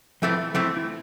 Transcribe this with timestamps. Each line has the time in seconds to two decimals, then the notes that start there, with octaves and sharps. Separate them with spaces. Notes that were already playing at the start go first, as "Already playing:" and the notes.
0.22 A2 E3 F3 A3 C4
0.54 A2 E3 F3 A3 C4
0.77 E4